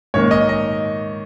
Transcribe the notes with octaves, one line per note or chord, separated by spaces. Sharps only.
G#2 D#3 A#3 C#5
D#5
D#5